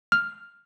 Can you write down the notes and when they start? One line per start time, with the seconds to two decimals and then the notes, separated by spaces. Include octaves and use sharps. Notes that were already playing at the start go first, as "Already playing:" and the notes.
0.12 F6